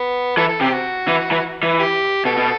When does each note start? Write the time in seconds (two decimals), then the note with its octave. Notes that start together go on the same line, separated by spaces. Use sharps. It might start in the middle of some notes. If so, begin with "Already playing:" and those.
Already playing: B3
0.37 E3 A4
0.49 A4
0.61 C3 G4
0.73 F#4
1.08 E3
1.31 E3
1.63 E3
1.79 G4
2.25 B2 A4
2.37 B2